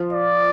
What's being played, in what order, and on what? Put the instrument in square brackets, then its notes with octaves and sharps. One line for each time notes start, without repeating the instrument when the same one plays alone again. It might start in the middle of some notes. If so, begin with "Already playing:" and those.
Already playing: [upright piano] F3 F4
[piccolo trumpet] D5